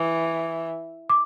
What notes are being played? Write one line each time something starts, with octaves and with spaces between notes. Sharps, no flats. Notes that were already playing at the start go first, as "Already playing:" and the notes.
Already playing: E3
D6